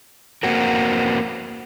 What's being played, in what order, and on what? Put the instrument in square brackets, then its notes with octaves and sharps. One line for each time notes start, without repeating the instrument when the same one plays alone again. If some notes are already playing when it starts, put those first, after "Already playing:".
[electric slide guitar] A#3 C4 F#4 A#4